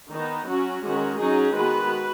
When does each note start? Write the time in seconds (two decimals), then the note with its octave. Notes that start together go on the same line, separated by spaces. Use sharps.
0.12 D#3 B3 D#4
0.48 F#3 C#4 F#4
0.83 D#3 G#3 C#4 F#4
1.18 F#3 C#4 D#4 G#4
1.54 D#3 G#3 B3 F#4 B4